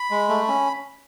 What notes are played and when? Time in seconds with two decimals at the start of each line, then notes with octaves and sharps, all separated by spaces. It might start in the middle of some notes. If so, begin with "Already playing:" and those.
Already playing: B5
0.11 G#3
0.29 A3
0.48 C#4